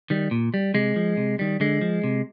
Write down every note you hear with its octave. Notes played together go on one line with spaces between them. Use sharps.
D#3 G3
A#2
G3
C3 G#3
F3
C3
D#3 G3
D3 G#3
F3
C3